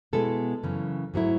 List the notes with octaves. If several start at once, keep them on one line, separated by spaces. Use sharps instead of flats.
B2 G#3 B3 E4 A4
F#2 C#3 E3
G#2 F#3 A3 E4